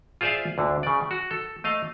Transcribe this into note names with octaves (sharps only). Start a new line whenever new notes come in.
F4 G#4 C5 D5 E5 F5
D2 D3
C#3 D5
F#4
A4
A3 D#5 F5